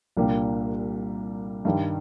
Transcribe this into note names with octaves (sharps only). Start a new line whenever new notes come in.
C2 A#2 G3 A#3 D4
G2 D#3 G3